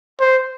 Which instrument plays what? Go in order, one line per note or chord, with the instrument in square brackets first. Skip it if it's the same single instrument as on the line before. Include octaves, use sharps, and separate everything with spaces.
[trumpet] C5